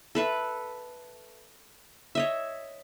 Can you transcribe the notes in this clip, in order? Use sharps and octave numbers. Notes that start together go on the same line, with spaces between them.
A4 B4 E5
C#5 D#5 E5